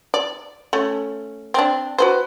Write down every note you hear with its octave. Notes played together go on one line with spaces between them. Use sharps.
D5
A3 C#4
C4 D4
F#4 B4 C5